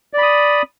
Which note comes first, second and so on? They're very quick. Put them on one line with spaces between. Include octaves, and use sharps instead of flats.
D5 B5 D#6